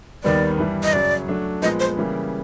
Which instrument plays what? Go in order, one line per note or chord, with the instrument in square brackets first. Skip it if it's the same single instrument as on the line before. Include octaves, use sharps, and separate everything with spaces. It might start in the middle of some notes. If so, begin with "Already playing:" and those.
[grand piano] D#2 D#3 G3 B3 [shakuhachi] D5
[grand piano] G2 E3 G3
[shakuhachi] D#5
[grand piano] F#2 C#3 F#3 [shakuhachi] D5
[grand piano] F#3 A3 D4
[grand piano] A#2 F3 G#3 B3 [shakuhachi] D#5
[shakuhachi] C5
[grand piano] C#3 E3 G3 A#3